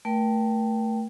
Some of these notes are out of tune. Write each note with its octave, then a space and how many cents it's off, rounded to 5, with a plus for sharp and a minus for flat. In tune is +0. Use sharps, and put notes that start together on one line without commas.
A3 +15 A#4 +40 G5 +0